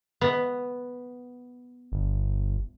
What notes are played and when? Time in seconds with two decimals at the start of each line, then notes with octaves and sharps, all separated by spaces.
0.21 B3
1.92 G1